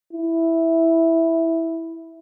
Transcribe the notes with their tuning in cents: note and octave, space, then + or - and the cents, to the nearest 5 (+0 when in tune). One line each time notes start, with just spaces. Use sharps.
E4 -5